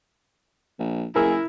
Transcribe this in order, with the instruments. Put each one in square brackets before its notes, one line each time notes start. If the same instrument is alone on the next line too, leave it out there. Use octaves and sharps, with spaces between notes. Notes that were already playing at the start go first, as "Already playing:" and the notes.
[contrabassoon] A#1
[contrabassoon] F#1 [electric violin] E4 [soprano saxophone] G#4 [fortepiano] A#4 E6